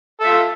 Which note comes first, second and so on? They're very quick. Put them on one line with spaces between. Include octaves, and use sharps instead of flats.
A4 E5 F4